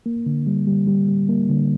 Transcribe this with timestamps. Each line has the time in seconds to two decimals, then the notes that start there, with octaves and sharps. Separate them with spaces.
0.06 A#3
0.26 D3
0.47 G3
0.67 G3
0.87 G3
1.08 G3
1.29 A#3
1.50 D3